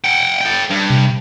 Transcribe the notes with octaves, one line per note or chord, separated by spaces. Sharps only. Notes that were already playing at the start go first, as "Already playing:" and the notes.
F#5 G5
A4 G5
G2
C3